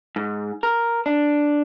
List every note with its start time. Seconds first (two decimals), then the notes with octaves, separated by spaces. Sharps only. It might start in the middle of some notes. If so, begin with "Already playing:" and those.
0.16 G#2
0.63 A#4
1.06 D4